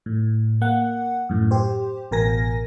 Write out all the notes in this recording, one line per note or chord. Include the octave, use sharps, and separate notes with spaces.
A2
A#3 F#5
F#2 A2
G4 C5
A1 B2 A#4 G#5 A#6